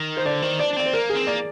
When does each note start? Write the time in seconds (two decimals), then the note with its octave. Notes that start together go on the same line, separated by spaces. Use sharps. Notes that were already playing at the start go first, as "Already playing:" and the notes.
Already playing: D#3
0.17 C5
0.25 D3 D5
0.42 D#3 C5
0.59 D4 D5
0.73 D4
0.76 C4 D5
0.86 C5
0.93 A#3 A#4
1.10 G#4
1.15 C4
1.27 A#3 D5